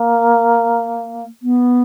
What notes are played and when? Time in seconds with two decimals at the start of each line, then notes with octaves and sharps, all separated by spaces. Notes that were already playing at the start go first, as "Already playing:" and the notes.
Already playing: A#3
1.42 B3